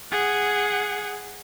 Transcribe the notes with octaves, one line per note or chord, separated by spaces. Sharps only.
G#4 F#5